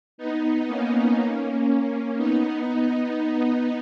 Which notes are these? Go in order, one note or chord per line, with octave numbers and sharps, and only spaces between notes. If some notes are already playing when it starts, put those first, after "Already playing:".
B3 D#4
A#3 C#4
A#3 C#4
B3 D#4